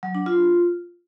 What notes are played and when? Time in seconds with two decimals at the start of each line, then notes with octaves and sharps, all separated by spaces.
0.03 F#3
0.15 D4
0.26 F4